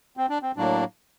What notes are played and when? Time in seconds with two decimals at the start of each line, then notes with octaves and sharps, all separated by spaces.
0.17 C4
0.29 D4
0.42 C4
0.56 A2 F#3 A#3 D4